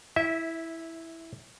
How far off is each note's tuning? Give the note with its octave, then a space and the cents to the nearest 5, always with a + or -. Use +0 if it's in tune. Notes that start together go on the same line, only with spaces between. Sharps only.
E4 -5 E5 -25